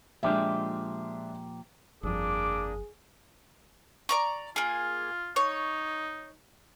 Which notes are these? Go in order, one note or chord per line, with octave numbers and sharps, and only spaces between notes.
A#2 F3 G#3 D4 G4 E5
G1 F2 A#3 D4 G#4 D6 D#6
D5 A#5 C#6
A#3 F4 G#4
D#4 C#5